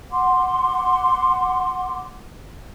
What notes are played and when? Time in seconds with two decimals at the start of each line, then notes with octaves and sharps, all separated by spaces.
0.11 F#5 C6 D6